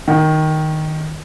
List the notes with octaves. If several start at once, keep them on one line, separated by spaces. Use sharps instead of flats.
D#3